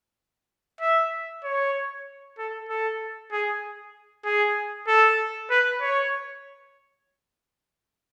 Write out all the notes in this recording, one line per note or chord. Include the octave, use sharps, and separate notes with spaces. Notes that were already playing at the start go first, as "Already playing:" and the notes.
E5
C#5
A4
A4
G#4
G#4
A4
B4
C#5